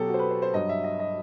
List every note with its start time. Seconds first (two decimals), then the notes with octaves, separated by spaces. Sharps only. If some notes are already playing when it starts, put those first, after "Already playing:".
Already playing: B2 F#3 G4 A4
0.08 F#4
0.14 C5
0.19 B4
0.30 C5
0.42 C5
0.54 G2 F#3 D#5
0.69 E5
0.84 D#5
1.00 D#5